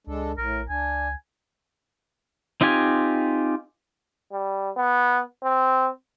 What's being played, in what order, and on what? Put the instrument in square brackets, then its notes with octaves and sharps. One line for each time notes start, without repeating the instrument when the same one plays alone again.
[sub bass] C#2 [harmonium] G#3 D4 A4
[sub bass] A#1 [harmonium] A2 [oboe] A#4
[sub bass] C#2 [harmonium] D4 [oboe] G#5
[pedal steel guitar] C4 D#4 F4 G4 G#5
[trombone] G3
B3
C4